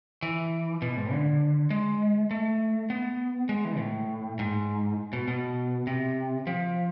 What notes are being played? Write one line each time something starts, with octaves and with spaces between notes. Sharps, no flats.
E3
B2
G#2
D3
G#3
A3
B3
G#3
E3
A2
G#2
B2
B2
C3
F3